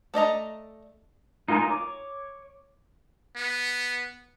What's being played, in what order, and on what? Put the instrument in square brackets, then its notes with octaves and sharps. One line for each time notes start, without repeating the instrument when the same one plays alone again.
[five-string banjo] A3 D5 D#5 A#5
[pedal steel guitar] D#4 F4 A#4 G#5 D#6
C#5 D6
[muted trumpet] B3